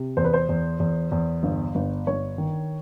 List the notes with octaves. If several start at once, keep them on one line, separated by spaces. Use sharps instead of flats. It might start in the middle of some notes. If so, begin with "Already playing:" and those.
Already playing: C3
E2 C5
B4
C5
E2
E2
E2
G1
G1
G1 C#5
D#3